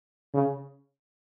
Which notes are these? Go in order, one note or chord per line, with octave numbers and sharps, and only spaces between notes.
C#3